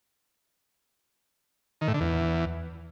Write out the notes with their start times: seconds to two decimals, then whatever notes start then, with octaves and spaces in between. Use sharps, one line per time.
1.81 D#3
1.88 A2
1.94 D3
2.01 E2